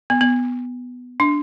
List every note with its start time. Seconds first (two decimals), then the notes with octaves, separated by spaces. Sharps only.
0.10 B3
0.21 B3
1.20 D4